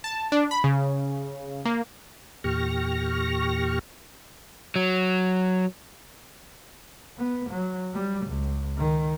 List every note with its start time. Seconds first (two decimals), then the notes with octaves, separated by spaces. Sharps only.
0.04 A5
0.32 D4
0.51 B5
0.64 C#3
1.65 A#3
2.44 E2 A#2 G4 C#6 F6 A#6
4.76 F#3
7.18 B3
7.50 F#3
7.94 G3
8.26 C#2
8.77 D#3